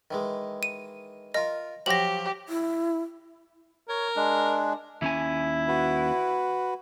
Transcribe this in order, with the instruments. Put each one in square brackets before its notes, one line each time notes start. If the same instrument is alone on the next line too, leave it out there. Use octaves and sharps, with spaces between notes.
[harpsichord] D#3 E3 G#3
[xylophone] D#7
[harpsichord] F4 A#4 [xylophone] D#5
[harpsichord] F3 F#3 [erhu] G4 [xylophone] A#6 F#7
[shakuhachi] E4
[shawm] A#4 [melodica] C#5
[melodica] G#3 D4
[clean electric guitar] D#2 C#4 G#5 [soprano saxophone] E4
[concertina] F#4 B4